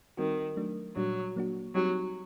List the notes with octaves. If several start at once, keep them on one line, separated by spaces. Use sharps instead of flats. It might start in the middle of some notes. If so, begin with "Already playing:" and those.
D#3 G3 C4 F#4
F#3 A3 D4
A#2 F#3 G3 D4
F#3 A#3 D4 F#4
F#3 G3 C4 D#4 G4